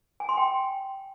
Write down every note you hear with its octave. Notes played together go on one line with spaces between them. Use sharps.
G#5
C6
G5